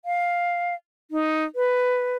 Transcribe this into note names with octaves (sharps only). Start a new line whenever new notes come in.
F5
D#4
B4